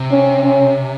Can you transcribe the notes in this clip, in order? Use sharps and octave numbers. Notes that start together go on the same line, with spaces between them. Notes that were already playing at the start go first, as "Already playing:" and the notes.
Already playing: C3
C#4
C#4